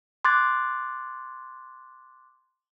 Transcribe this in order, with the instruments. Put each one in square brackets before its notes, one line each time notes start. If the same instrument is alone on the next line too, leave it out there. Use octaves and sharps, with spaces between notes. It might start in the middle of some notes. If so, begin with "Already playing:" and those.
[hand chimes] C6 D6 F#6 G#6 A6